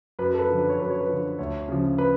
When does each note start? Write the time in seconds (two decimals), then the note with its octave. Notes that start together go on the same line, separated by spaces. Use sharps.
0.19 F#2 B4
0.34 A4
0.39 B4
0.49 D3 F3
0.58 B4
0.69 C#5
0.79 F#2 B4
0.90 C#5
1.00 B4
1.09 D3 F3
1.38 D2 C#5
1.68 C#3 F3
1.98 B4